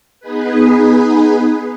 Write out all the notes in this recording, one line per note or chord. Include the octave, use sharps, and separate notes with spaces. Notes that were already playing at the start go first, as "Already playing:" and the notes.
B3 D#4 G#4 B4